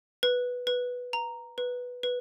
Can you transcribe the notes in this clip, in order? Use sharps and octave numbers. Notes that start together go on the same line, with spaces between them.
B4
B4
A#5
B4
B4